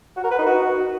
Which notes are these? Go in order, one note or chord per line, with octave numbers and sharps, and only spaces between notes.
F#4
A#4
B4
D#4
F#4